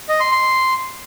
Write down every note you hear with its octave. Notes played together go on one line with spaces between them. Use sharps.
D#5
C6
C6